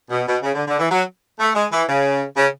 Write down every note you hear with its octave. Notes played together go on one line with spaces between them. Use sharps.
B2
B2
C#3
D3
D3
E3
F#3
A3
G#3
E3
C#3
C#3